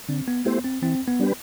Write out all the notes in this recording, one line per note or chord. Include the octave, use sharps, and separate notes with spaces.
D3 C4
B3
A3 B3 E4 G4 C5
C4
E3 C4
B3
G3 D4 G4 B4